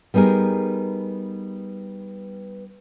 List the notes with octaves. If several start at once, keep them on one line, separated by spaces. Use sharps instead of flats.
G3 B3 D#4 G#4 A#4